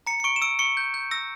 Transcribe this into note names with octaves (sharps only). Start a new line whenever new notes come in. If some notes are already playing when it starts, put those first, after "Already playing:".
A#5 C#7
C#7
C#6 D7
E7
E6 D7
C#6 C#7
G6
G6
E6 A#6